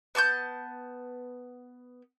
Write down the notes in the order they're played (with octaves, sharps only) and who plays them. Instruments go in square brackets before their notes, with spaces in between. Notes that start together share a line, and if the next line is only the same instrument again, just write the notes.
[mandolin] B3 A5 C#6 G6